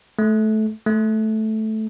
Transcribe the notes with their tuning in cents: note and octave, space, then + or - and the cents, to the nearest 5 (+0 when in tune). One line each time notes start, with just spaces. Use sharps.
A3 -20
A3 -10